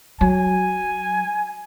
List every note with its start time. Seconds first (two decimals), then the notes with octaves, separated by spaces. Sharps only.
0.21 F#3 G#5